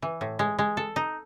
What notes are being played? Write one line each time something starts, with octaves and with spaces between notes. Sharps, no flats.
E3
A2
G#3
G#3
A4
D#4